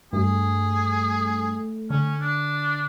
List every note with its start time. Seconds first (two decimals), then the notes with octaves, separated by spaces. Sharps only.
0.13 G2 A3 G#4
1.90 D3 C#4
2.21 D4